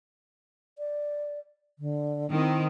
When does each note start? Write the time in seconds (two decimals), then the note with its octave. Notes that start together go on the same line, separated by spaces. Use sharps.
0.78 D5
1.79 D3
2.31 D#3 C4 E4